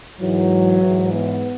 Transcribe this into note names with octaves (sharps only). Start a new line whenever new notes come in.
G#2 E3 F#3
G#2 E3
B3